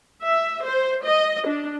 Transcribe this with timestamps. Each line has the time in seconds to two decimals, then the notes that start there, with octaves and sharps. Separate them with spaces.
0.23 E5
0.65 C5
1.05 D#5
1.47 D4